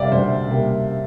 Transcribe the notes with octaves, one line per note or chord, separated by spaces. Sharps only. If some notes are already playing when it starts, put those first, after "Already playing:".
Already playing: C3 G3 A#3 D5 E5 F5
D2 C5
C3 G3 A#3